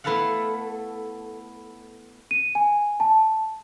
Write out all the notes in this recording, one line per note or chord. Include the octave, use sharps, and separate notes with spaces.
A3 B3 E4 A4 F5 F#5
D#7
G#5
A5